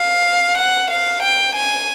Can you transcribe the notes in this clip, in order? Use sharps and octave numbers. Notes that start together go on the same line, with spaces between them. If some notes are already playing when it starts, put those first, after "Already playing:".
Already playing: F5
F#5
F5
G5
G#5